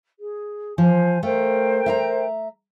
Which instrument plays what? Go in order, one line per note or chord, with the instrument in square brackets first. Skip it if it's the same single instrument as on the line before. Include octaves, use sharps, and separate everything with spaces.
[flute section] G#4
[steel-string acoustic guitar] F3 [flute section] C5 G#5
[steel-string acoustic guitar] A3 F4 [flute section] A#4 C5 G5
[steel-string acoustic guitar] E5 F5 A#5